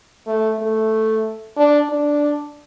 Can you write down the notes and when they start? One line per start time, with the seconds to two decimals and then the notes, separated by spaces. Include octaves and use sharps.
0.27 A3
0.59 A3
1.57 D4
1.89 D4